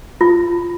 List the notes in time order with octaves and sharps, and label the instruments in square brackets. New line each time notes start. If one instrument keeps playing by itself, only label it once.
[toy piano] F4